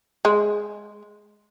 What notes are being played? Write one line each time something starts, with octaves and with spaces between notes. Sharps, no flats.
G#3